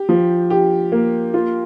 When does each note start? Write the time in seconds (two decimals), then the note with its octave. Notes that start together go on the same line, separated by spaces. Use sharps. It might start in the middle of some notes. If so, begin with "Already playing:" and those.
Already playing: G4
0.09 F3
0.50 G4
0.92 A#3
1.34 F4